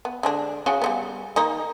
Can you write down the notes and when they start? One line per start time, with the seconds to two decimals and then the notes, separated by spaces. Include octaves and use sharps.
0.05 B3
0.23 D3 G#3 D4
0.66 C#3 F#4 C#5
0.82 G3 A3 B3
1.36 D#3 A#3 D#4